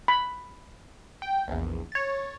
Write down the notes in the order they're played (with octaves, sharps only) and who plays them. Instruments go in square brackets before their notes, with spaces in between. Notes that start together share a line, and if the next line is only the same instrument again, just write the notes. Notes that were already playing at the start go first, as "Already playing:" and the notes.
[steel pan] B5
[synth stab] G5
A#1 E2
C#5 A6